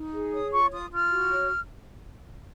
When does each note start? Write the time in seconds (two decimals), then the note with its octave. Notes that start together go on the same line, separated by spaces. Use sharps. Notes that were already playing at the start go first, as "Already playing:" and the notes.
Already playing: D#4
0.13 G#4
0.32 C#5 D#6
0.53 F4 C#6
0.71 F4 D#6
0.91 F4 F6
1.11 F#4
1.30 C#5